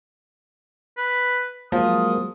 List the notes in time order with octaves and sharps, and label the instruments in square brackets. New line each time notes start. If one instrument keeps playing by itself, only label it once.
[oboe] B4
[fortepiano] F3 [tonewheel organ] F#3 G#3 A#3 [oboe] D#6